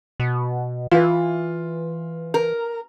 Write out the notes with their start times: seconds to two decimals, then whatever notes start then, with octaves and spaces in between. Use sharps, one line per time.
0.20 B2
0.91 E3 F4 B4 F5
2.34 A#4 B4